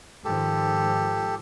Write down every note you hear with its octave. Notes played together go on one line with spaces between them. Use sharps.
G#2 D#3 F3 G4 A4